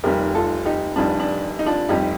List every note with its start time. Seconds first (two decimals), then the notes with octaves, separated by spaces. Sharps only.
0.04 F1 F2 D#3 G3 G4 A#4
0.34 F4 A4
0.66 D#4 G4
0.96 F1 F2 D#3 G3 D4 F4
1.20 D4
1.59 D#4
1.66 D4 F4
1.89 F1 F2 D#3 G3 D#4 G4